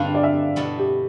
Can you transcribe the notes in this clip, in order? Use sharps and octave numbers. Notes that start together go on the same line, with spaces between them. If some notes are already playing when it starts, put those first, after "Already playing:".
Already playing: G2 D3 G3 D4 E4 F5
D5
E5
B2 B3 E4 A4
G4